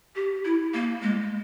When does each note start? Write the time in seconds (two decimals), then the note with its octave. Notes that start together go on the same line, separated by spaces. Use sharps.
0.16 G4
0.45 E4
0.74 A#3
1.02 G#3